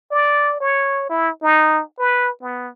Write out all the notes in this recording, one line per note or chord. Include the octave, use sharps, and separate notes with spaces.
D5
C#5
E4
D#4
B4
B3